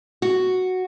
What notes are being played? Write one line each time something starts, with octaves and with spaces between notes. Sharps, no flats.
F#4